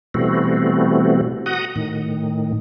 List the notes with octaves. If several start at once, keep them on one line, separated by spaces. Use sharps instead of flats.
B2 E3 G3 A3 C4 F#4
F#4 F#5 A#5 D#6
A2 D#3